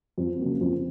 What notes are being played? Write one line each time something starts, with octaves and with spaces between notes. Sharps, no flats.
F2
C#3 F#3 A#3
F2